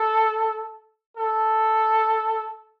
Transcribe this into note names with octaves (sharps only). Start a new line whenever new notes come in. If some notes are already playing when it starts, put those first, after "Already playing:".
Already playing: A4
A4